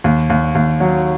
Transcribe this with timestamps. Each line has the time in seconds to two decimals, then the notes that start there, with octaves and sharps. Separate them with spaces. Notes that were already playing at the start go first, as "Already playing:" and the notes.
0.04 D#2
0.30 D#2
0.55 D#2
0.80 F#3